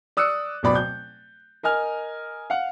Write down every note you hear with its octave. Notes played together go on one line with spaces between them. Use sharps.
D5 D#6 E6 F#6 C#7
D1 B2 D5 B5
G6
A#4 D#5 G#5 F6
F5 F#5